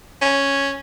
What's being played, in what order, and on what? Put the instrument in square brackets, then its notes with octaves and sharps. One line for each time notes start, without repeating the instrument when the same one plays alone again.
[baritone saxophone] C#4